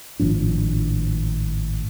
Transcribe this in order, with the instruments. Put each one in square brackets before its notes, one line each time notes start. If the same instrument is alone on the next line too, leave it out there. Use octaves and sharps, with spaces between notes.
[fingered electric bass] G#1 A2 F3 D4